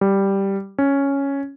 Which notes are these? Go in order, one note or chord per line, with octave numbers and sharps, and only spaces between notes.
G3
C#4